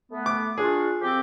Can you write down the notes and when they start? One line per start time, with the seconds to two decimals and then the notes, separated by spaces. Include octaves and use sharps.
0.11 A3 B3
0.26 D6
0.58 D4 F4 F#4 G#4
1.01 F2 C4 G4